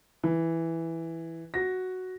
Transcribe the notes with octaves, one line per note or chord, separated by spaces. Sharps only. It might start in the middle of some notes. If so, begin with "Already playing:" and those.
E3
F#4 A#6